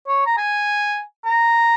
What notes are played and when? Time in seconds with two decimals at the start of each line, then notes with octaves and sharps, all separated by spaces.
0.08 C#5
0.26 A#5
0.37 G#5
1.25 A#5